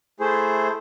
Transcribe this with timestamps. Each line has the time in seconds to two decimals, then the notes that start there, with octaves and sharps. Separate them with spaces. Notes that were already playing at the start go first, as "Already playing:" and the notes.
0.20 A3 E4 G#4 C5